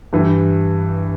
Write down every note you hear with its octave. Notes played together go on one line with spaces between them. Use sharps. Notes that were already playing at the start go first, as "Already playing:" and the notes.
G2 E3 G3